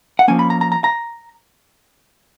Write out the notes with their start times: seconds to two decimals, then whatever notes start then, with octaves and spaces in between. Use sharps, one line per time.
0.19 F#5
0.28 F3 A#3 C#4 G#5
0.39 B5
0.50 A#5
0.61 A#5
0.72 A#5
0.84 A#5